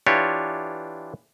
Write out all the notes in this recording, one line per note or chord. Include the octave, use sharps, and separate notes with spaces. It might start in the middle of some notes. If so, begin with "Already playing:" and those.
E3 D4 F4 G4 C#5